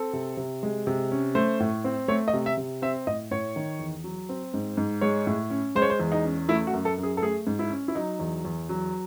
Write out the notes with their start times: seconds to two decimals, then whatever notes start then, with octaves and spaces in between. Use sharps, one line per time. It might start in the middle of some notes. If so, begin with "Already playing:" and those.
Already playing: C4 A4
0.13 C3
0.37 C3
0.63 G#3
0.87 C3
1.12 C#4
1.35 A3 C5
1.60 A2
1.84 C4
2.08 A3 C#5
2.28 D#5
2.33 C3
2.46 E5
2.57 C3
2.82 C4 E5
3.07 A2 D#5
3.31 A2 C#5
3.56 D#3
3.79 E2
4.04 F#3
4.29 C4
4.54 G#2
4.77 G#2
5.01 G#3 C#5
5.27 A2
5.50 C#4
5.75 G#3 C5
5.82 C#5
5.90 C5
6.00 E2
6.12 D#4
6.25 C#4
6.48 A3 E4
6.67 F#4
6.73 F#2
6.85 A4
6.98 F#2
7.03 G#4
7.17 A4
7.22 A3 G#4
7.47 G#2
7.59 E4
7.70 C#4
7.88 E4
7.95 F#3 D#4
8.19 E2
8.45 E2
8.69 F#3